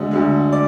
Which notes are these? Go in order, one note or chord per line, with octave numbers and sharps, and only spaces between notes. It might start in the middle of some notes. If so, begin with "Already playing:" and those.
Already playing: D2 D3 G#3 D#5
D2 D3 G#3
D5